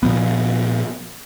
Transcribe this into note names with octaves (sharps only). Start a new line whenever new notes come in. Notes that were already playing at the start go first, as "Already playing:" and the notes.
A#2 F3 B3